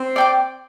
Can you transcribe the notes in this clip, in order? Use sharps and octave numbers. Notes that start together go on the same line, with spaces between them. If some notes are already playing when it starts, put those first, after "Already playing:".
Already playing: C4
D5 G5 D6